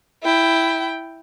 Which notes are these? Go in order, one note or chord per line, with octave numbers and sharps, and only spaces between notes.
E4 G5